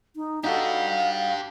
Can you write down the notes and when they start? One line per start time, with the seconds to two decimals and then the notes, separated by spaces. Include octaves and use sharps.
0.16 D#4
0.44 D4 D#4 F#4 G4 A4 F5